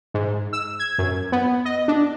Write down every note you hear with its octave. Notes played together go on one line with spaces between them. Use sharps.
G#2
E6
G#6
F#2
B3
D#5
D4